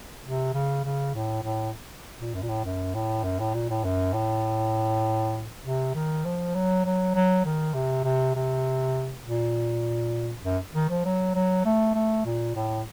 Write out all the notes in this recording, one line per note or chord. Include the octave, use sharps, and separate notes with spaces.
C3
C#3
C#3
A2
A2
A#2
F#2
A#2
A2
F#2
A2
F#2
A2
A#2
A2
F#2
A2
C3
D#3
F3
F#3
F#3
F#3
D#3
C3
C3
C3
A#2
F#2
D#3
F3
F#3
F#3
A3
A3
A#2
A2